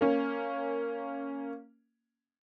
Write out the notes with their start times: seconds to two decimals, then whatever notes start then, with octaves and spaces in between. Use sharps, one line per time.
0.01 A#3 C#4